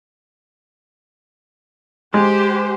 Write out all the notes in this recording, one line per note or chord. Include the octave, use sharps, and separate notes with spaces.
G#3 G4 C5